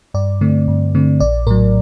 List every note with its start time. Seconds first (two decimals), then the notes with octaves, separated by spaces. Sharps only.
0.14 G2 D5
0.41 D3 A3 C4
0.68 G2
0.95 D3 A3 C4
1.20 A#1 D5
1.47 A2 F#3 A#4